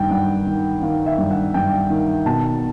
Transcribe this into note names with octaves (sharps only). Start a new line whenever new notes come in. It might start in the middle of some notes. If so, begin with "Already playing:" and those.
Already playing: G2 D#3 G5
G2 F#5
D#3
D#3 F5
E5
G2
F#5
G2 G5
D#3
B2 A5